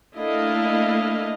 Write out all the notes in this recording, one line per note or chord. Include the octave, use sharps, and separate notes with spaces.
A3 A#3 D4 E4 D#5 F5